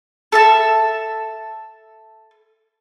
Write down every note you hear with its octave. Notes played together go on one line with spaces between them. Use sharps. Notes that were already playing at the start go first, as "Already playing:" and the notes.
A4 E5 A5